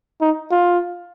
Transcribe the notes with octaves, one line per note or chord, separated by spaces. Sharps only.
D#4
F4